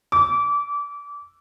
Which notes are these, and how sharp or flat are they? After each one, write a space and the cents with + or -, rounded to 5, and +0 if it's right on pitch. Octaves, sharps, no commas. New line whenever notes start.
D6 -25